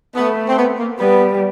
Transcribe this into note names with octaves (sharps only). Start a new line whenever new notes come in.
A3 B3
C4
B3
A#3
G3 B3